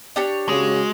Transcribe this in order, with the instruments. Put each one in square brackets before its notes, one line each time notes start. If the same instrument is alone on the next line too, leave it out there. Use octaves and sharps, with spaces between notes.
[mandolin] D4 G4 C#5
[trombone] C#3 [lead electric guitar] G#3 [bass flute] F#4